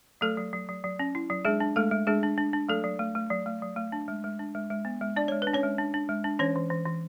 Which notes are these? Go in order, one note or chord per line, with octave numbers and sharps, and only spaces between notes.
F#3 A3 A4
F#3
F#3
F#3
F#3
C#4
E4
F#3
G#3 D4 G#4
D4
G#3 A3 A4
G#3
G#3 D4 G#4
D4
D4
D4
F#3 A3 A4
F#3
A3
A3
F#3
A3
F#3
A3
D4
G#3
G#3
D4
G#3
G#3
B3
G#3
D4 D5
G#3 C#5
D4 B4
C#4 C#5
G#3
D4
D4
G#3
D4
E3 C#4 C#5
E3
E3
E3